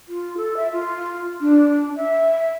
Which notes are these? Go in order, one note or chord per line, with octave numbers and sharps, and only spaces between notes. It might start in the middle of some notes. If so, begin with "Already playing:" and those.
F4
A4
E5
F4
D4
E5